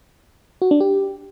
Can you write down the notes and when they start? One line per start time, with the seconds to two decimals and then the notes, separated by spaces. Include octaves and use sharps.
0.62 F#4
0.71 D4
0.80 G4